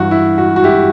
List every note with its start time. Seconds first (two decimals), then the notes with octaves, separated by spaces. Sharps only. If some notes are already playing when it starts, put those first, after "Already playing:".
Already playing: G2 E3 F#4
0.11 E4
0.38 F#4
0.56 F#4
0.64 E4 G4